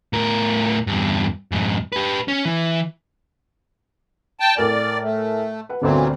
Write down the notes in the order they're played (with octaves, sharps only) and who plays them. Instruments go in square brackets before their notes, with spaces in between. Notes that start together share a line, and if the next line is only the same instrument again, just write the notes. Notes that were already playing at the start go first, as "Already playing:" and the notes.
[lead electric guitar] A2 A#4
E2 G2
F2 G#2
G4 B4
C#4
E3
[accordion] G5 A5
[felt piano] A2 A#4 G#5 [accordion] D5
[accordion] A3
[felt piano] B4 F#5
[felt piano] G1 D2 C4 [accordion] A#2 E3 F#3